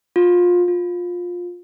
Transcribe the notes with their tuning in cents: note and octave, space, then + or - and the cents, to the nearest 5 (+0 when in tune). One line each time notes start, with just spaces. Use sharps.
F4 +20
F4 +15